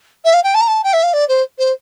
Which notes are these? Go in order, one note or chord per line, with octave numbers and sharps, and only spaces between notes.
E5
F5
G5
A5
A#5
A5
G5
E5
F5
D5
C5
C5